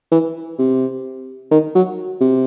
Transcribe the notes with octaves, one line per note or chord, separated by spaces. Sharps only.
E3
C3
D#3
F#3
C3